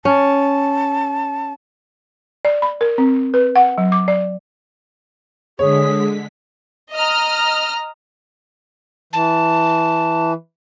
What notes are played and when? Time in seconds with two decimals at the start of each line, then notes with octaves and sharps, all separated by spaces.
0.05 C#4 A5
2.45 D5
2.62 B5
2.81 A#4
2.98 C4
3.34 B4
3.56 F#5
3.78 F#3
3.92 D6
4.08 D5
5.59 D3 G#3 G#4 C#5 B6
6.93 D#5 A#5 F6
9.13 E3 A5